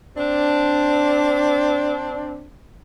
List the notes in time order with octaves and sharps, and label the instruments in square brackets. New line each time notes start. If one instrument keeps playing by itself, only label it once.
[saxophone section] C4 D4